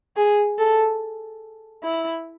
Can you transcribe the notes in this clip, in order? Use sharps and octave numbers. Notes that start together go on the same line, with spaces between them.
G#4
A4
E4